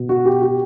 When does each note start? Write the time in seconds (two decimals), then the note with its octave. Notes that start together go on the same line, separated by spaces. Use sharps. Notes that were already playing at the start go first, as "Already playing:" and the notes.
Already playing: B2
0.09 F#4
0.25 G4
0.42 G4